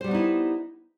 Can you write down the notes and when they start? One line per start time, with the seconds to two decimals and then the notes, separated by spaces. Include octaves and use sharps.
0.01 C5
0.04 G3
0.08 B3
0.11 D#4
0.15 E4